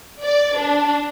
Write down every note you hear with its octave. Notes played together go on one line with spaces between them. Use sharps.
D5
D4